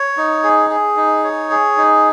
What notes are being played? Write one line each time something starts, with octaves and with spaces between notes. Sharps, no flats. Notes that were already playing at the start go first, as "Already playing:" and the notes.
Already playing: C#5
D#4
G#4
G#4
D#4
C#5
G#4
D#4